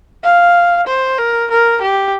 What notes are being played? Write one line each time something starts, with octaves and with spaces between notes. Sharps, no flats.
F5
C5
A#4
A#4
G4